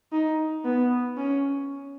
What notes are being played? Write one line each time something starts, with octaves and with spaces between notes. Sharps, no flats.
D#4
B3
C#4